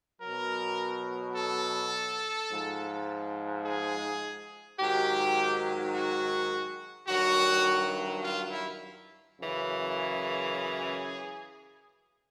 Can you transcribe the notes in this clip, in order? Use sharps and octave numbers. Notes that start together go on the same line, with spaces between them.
B2 F#3 A#4
A4
G#2 F3
G#4
G#2 D#3 F#3 G4
F#4
G2 D#3 F#3 F#4
F4
E4
F#2 C#3 E3
G#4